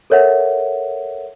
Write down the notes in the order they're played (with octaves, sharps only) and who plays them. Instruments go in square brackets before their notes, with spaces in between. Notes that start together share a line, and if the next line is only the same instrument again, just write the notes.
[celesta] A4 A#4 C#5 E5 F#5